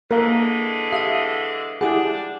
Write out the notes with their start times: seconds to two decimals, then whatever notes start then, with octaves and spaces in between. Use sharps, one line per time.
0.11 D3 E3 G#3 A#3 A#4 F5 E6
0.92 G4 E5 F5 D#6 F6 D#7
1.81 F3 D4 E4 G4 G#4 F#5 D6